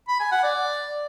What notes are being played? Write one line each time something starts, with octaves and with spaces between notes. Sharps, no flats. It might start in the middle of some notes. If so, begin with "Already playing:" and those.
B5
G#5
F#5
D5